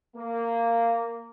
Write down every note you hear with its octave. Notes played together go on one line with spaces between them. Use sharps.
A#3